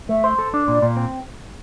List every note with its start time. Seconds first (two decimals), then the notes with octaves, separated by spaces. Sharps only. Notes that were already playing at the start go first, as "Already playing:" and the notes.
0.09 A3 E5
0.24 C5
0.39 A4
0.54 D4
0.68 A#2 D5
0.82 A#2
0.97 C4